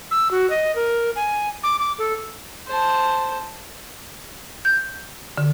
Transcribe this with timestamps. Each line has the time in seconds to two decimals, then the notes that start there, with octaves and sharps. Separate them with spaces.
0.11 E6
0.31 F#4
0.50 D#5
0.76 A#4
1.16 G#5
1.63 D6
1.79 D6
1.99 A4
2.68 C5 A5
4.65 G6
5.38 D3